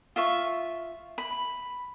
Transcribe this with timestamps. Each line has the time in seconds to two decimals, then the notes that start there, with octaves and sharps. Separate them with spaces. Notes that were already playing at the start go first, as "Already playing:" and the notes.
0.16 F4 E5 C#6
1.18 B5